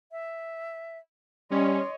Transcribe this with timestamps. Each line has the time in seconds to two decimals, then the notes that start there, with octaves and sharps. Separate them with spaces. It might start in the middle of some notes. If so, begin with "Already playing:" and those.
0.12 E5
1.51 G3 C#4 C#5 D#5 C6